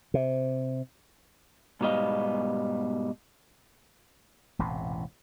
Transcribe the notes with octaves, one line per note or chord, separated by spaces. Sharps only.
C3
G#2 B2 G3 B3 D#5 F5
E1 A1 A2 C3